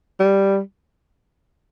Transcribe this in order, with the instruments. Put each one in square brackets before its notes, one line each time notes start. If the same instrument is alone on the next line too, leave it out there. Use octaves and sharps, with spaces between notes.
[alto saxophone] G3